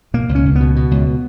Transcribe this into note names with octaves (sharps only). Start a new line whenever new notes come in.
B2 A#3
C#2
C#4
C#2
B2 B3
B2
C#2